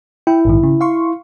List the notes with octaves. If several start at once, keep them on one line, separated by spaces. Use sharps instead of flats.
E4 G5
A#1 G#2 D#3
C#3
F5 C6 C#6